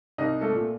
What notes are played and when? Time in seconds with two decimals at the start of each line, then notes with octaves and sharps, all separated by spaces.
0.18 C2 D#4 D#5
0.41 A3 A4
0.54 A#2